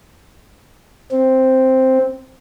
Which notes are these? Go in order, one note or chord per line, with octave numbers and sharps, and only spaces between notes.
C4